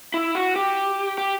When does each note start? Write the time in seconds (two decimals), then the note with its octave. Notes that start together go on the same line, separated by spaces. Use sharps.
0.14 E4
0.35 F#4
0.56 G4
1.18 G4